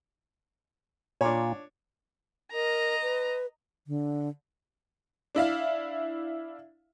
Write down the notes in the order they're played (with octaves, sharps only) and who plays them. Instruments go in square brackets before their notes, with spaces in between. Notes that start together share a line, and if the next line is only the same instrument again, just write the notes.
[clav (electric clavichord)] A#2 F4 [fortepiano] D4 C#5
[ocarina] A#4 [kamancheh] D#5 A#5
[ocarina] B4
[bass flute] D3
[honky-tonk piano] D4 E4 E5 F5